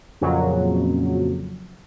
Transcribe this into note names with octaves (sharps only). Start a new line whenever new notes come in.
F2 A#2 C#3 F#3